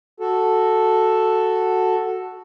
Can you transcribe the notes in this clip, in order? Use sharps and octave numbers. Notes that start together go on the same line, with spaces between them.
F#4 A4